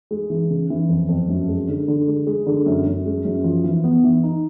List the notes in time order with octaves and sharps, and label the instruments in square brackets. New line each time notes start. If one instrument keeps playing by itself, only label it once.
[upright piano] G#3
E3
C#3
E3
F2
F2
F#2
G#3
D3
D3
G#3
G#3
D3
F#2
F#2
G#3
F#2
F3
E3
B3
E3
D#4